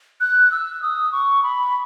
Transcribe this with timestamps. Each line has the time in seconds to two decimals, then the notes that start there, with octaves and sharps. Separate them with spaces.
0.20 F#6
0.52 E6
0.82 D#6
1.12 C#6
1.43 B5